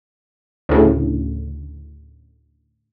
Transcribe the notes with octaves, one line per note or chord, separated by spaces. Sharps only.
D2 A2 C#3